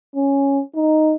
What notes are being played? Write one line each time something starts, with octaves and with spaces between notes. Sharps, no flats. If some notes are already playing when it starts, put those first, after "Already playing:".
C#4
D#4